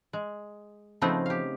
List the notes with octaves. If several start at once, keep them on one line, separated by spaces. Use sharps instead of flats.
G#3
C#3 F3 A3 B3 C4 D#4
G4 F5